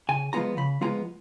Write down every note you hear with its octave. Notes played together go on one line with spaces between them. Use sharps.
C#3 G#5
F3 G#3 B3 F4 A#5
C#3 B5
F3 G#3 B3 F4 A#5